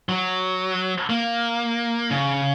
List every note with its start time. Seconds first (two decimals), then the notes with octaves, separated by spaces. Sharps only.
0.09 F#3
1.10 A#3
2.11 C#3